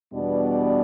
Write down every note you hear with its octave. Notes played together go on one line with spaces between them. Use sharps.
E2 B2 G3 B3 D4 D5